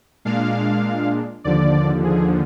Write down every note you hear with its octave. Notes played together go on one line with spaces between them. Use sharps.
A#2 G#3 D4 F5
D#2 D3 F3 D5
G#4